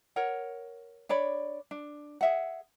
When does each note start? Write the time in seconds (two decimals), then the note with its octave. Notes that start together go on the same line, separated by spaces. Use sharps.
0.16 A#4 C#5 F#5
1.09 D4 C#5 D5 B5
1.71 D4
2.21 G#4 E5 F#5